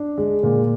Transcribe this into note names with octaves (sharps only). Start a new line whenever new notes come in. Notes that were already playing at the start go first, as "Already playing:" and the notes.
Already playing: D4
G#3
A#2